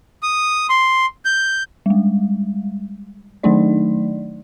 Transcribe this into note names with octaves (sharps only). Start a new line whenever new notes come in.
D#6
C6
G6
G3 G#3
D#3 F#3 A3 D4 D#4 D5